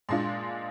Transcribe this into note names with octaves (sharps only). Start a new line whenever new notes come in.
A#2 G#3 D4 F4 C6